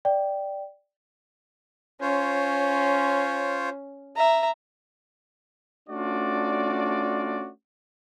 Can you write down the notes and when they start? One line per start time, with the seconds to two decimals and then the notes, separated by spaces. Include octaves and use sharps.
0.05 D5 G5
2.01 C#4 F4 C5 C#5
4.17 E5 A#5
5.89 A3 C#4 D4 F4 F#4 D5